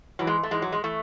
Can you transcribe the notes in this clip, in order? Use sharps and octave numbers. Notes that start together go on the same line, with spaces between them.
G#2 E3 F#3
G#3
A3
G#2 E3 G#3
F#3
G#3
E3 A3